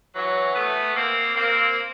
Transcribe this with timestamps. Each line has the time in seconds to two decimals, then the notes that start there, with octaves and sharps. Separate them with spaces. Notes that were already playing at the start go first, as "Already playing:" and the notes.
0.15 E3 F#3
0.55 A3 B3
0.95 A#3 C4
1.35 A#3 C4